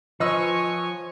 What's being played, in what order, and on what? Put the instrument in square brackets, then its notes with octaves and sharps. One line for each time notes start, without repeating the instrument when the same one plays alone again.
[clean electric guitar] F3 [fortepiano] B4 D#5 E6 [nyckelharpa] C#5 G#5 [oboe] C#6